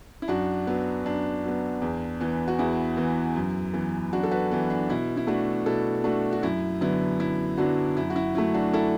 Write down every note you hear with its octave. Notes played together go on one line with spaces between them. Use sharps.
E4
F#2 D4 F#4
F#3 B3
F#2 D4
F#3 B3
E2
E3 B3
F#4
E2 E4
E3 B3
F#2
E3 B3
F#2 D4 F#4
A4
F#4 B4
E3 B3
D4
B2 E4
E4
A3 D4 F#4
B2 E4 A4
A3 D4 F#4
F#4
F#2 E4
D3 F#3 B3 E4
F#2 E4
D3 F#3 B3 D4 F#4
F#2 E4
F#4
E4
F#3 A3 E4
D4 F#4
E4 A4